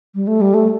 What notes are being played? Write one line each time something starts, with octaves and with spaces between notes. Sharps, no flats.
G3
A3
G3
A3